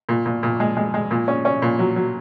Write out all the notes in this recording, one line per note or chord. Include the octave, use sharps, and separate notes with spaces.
A#2
A#2
A#2
G#3
G#3
G#3
A#2
C#4
C#4
A#2
F#3
F#3